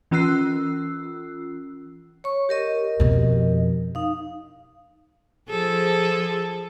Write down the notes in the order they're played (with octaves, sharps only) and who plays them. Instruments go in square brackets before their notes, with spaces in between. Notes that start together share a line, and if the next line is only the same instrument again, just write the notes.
[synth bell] E3 C#4 F4 E6 F#6 C7
[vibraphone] C#5 C#6
G4 A#4 D#5
[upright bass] F2 B2
[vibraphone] D#4 F5
[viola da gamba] F3 G#4 A4